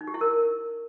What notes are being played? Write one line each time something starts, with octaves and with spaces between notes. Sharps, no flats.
D#4
G4
E4
A#4